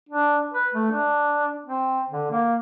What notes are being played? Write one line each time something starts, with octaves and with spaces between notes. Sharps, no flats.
D4
B4
A3
D4
C4
D3
A#3